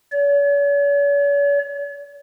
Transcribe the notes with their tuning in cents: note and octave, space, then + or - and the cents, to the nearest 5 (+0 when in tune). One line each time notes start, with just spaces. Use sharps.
C#5 +45